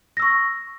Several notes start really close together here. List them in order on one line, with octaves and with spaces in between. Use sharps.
A#6 E6 C#6